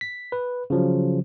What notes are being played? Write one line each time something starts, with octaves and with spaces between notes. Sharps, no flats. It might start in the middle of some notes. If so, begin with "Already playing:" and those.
B6
B4
C#3 F3 F#3